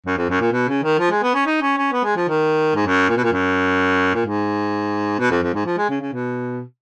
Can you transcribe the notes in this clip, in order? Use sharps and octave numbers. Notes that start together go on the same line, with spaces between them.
F#2
F2
F#2
A#2
B2
C#3
D#3
F3
G#3
B3
C#4
D#4
C#4
C#4
B3
G#3
F3
D#3
G#2
F#2
A#2
B2
A#2
F#2
A#2
G#2
B2
F2
F2
G#2
F3
G#3
C#3
C#3
B2